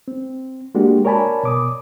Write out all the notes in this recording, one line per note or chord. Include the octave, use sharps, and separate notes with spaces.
C4
G#3 A#3 D4 F#4 G4
A#4 C#5 D5 G#5 A5 B5
B2 D6 D#6